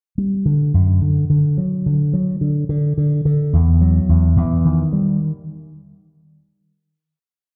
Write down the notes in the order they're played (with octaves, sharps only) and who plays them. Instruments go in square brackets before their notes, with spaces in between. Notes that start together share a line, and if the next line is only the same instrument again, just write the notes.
[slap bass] G3
D3
F#2
D3
D3
F#3
D3
F#3
D3
D3
D3
D3
E2
F#3
E2
E2
D#3
G3